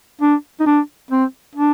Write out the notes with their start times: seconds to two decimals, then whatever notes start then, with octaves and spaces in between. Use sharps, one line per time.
0.21 D4
0.60 D#4
0.66 D4
1.11 C4
1.55 D4